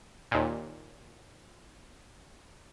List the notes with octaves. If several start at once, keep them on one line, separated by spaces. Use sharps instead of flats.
D#2 A#2